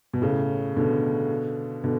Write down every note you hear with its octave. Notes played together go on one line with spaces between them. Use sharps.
B2
A2 C#3
B2 D3
B2 D3